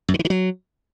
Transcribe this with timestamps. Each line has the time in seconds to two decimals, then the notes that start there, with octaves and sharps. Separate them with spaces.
0.08 F#2
0.14 D3
0.19 E3
0.25 D#3
0.30 F#3